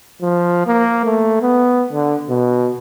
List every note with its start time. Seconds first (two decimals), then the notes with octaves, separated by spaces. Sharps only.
0.22 F3
0.66 A#3
1.05 A3
1.41 B3
1.92 D3
2.29 B2